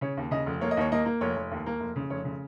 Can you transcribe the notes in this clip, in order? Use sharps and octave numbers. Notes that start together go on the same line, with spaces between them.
C#3 C#5
D#2
C#3 D#5
F1
A#3 C#5
D#5
D#2 C#5
A#3 D#5
A#3
F1 C#5
F1
D#2
A#3
F1
C#3
F1 C#5
C#3